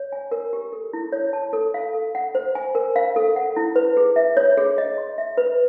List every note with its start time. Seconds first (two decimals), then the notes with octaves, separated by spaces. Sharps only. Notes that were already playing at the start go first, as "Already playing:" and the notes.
Already playing: C#5
0.12 G#5
0.31 A#4
0.53 G4
0.72 A4
0.93 E4
1.12 C#5
1.33 A5
1.53 A4
1.74 F5
1.94 A4
2.15 F#5
2.35 C5
2.55 G#5
2.75 A#4
2.96 F5
3.16 A4
3.36 F#5
3.56 E4
3.76 B4
3.97 G#4
4.16 E5
4.37 C#5
4.58 G#4
4.78 D#5
4.98 C6
5.18 E5
5.37 B4